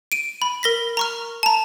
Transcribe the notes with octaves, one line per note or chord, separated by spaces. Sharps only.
D7 D#7
B5
A#4 A#6 B6
A#5 C#6 F6
A5 A#5